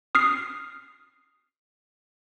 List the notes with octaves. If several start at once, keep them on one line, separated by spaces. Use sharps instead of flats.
D#6 F6 C7